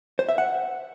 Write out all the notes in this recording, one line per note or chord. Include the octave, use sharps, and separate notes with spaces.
C5
E5
F#5